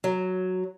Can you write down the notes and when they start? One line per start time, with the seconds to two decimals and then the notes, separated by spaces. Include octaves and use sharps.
0.04 F#3